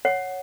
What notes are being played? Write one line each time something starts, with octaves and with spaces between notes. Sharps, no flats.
C#5 F#5